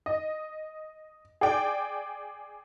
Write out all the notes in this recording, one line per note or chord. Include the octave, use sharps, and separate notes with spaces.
D#5
G#4 D5 G5